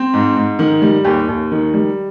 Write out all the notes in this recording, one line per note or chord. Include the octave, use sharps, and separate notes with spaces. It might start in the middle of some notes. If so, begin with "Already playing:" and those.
Already playing: C4
G#2
G#2
D#3
G3
D#2 G4
D#2
D#3
G3